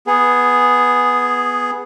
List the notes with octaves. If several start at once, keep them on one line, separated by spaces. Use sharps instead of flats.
B3 G#4